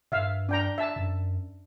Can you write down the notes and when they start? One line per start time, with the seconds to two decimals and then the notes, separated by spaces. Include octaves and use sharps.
0.12 G2 E5 F5
0.49 D4 G5 A#5
0.78 E5 A5
0.96 F#2